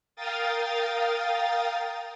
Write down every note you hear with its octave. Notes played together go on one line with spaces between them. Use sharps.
A#4 F5 G5 D#6 A6